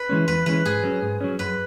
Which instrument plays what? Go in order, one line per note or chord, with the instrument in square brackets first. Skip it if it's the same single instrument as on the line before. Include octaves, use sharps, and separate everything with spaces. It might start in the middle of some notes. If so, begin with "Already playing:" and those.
Already playing: [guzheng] B4
[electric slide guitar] E3 G#3 C#4
[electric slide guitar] E2 [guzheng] B4
[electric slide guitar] E3 G#3 C#4 [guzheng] B4
[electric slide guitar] G#2 [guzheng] G#4
[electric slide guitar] F#3 C#4
G#2
F#3 C#4
[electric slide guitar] F#2 [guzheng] B4